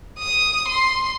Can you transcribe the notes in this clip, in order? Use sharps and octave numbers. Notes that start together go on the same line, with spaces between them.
D#6
C6